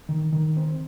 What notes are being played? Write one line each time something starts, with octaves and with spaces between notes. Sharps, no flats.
D#3
D#3
C4